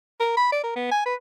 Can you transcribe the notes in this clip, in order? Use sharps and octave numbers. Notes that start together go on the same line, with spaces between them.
A#4
B5
D5
A#4
B3
G#5
B4